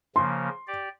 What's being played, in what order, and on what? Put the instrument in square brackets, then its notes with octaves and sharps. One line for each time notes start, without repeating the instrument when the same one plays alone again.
[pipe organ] C#3 F3 A#3 [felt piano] C6
[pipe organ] G4 D5